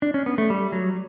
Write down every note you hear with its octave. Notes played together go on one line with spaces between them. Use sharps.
D4
C#4
B3
A3
G3
F#3